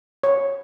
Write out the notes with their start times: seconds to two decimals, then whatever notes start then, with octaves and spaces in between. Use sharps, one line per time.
0.24 C#5